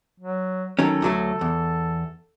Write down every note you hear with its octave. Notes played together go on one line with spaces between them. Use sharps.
F#3
D#3 F#3 C#4 A4
D2 F#3 A3
E2